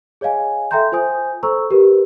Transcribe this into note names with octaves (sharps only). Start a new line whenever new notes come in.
G#4 C#5 D#5 F5 G#5
A4 E5 G5 A#5 C6 G6
F4 C5 G#5 D#6 G6
A4 C5 A#5 C#6 E6
G4 A#4 B4